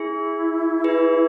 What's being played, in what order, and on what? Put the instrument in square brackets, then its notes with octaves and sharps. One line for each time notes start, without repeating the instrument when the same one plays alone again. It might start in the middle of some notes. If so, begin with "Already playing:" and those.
Already playing: [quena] E4 [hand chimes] G#4
[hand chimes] G#4 B4